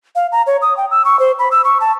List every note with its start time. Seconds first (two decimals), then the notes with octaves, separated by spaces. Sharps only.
0.16 F5
0.32 A#5
0.47 C#5
0.62 D#6
0.77 G5
0.91 E6
1.05 C#6
1.19 C5
1.39 B5
1.51 E6
1.64 C#6
1.81 A5